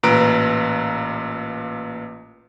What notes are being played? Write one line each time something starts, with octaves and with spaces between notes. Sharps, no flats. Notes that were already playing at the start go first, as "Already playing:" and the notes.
A1 A#2 B4 A#5 D7